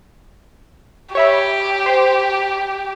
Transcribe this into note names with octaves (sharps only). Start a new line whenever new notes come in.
G4 C#5 E5 B5
C5